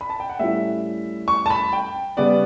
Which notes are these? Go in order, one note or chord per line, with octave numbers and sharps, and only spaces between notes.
B5
A5
G5
F#5
A2 G3 C#4 E4 E5
C#6
A5
B5
G5
C#3 G3 B3 D5